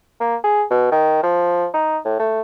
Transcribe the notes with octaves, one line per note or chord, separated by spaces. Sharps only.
A#3
G#4
B2
D#3
F3
D#4
A2
A3